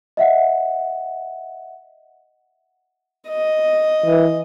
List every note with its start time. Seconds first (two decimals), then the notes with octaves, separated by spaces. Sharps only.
0.17 D#5 E5 F#5
3.28 D#5
4.06 E3